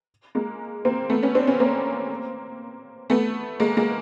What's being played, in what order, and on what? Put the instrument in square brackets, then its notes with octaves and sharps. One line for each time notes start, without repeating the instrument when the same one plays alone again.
[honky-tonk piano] G#3 A#3
A#3 C4
A3 B3
B3 C#4
C4 D4
B3 C#4
A#3 C4
A3 B3
G#3 A#3
G#3 A#3